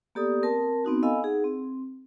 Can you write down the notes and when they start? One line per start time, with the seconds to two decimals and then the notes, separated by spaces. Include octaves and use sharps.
0.15 A#3 B3 G4 A4 D5 D#6
0.42 C4 A#4 A5
0.85 B3 C4 D#4 F#4
1.03 A4 D#5 F5 G#5 B5 E6
1.22 D#4 G#4 F#5
1.44 C4